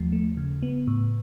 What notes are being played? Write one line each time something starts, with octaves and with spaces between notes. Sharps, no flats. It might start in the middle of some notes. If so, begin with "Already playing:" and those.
Already playing: D#2 F3 A3
A3
C#3
B3
A2